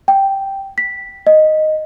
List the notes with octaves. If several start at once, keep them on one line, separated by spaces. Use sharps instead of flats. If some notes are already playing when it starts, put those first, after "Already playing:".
G5
B6
D#5